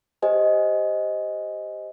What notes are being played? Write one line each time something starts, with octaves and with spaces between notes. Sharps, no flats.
G4 C5 D#5 G#5